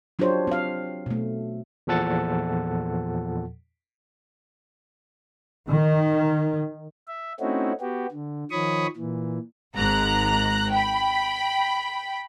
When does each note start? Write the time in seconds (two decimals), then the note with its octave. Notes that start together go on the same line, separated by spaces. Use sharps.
0.19 F#3 D4 F4 G4 C5 C#5
0.47 C4 F5
1.06 B2 A3
1.87 E2 A#2 F3 A4 F#5 A6
5.69 D#3
7.08 E5
7.40 A3 C4 C#4 D#4 E4 F#4
7.81 B3 F#4 G4
8.11 D3
8.51 D#3 F3 C#5 B5 C#6 D#6
8.97 A#2 E3
9.76 G#1 G#2 A#5 F#6
10.70 G5 B5